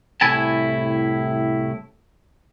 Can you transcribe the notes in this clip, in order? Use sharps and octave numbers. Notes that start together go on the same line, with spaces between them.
C2 A2 E4 G#5 A5